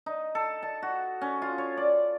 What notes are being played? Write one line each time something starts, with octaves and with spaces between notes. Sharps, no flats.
D#4
A4
A5
F#4
C#4
F4
C#5
D5